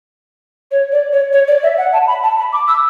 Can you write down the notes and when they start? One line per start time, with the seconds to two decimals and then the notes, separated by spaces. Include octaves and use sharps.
0.71 C#5
0.92 D5
1.13 C#5
1.33 C#5
1.48 D5
1.63 E5
1.78 F#5
1.93 A5
2.07 B5
2.23 A5
2.38 B5
2.52 D6
2.68 E6